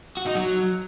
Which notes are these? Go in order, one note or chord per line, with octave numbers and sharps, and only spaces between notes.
F#4
D#4
F#3